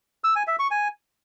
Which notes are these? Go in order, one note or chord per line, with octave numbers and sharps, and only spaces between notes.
E6
G#5
E5
C#6
G#5